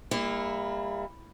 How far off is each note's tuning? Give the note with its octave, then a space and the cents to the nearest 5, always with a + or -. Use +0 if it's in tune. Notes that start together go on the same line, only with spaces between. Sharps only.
G3 +40 A#3 +0 E4 +0